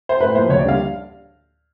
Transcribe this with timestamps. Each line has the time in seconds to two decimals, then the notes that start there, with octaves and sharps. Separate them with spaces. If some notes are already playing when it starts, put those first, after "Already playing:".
0.09 C5
0.20 A2 B4
0.35 F3 A#3 C5
0.49 D2 C#5
0.59 D5
0.65 D3 G3 A#3 F5